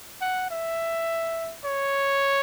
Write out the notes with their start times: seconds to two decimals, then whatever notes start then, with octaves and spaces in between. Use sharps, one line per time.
0.21 F#5
0.51 E5
1.65 C#5